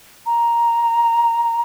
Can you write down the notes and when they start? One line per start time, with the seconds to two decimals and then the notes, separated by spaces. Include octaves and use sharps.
0.26 A#5